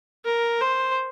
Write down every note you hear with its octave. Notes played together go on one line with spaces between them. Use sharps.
A#4
C5